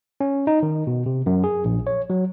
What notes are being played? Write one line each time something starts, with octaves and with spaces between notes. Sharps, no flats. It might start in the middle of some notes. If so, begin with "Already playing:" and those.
C#4
D#4
D#3
B2
C3
F#2
G#4
A#1
C#5
F#3